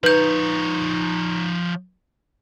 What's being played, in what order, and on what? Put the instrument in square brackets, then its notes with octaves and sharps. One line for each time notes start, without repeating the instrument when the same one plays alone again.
[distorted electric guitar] F3 C#5 [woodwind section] D#4 [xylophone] B4 G6